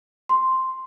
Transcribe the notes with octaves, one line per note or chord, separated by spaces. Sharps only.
C6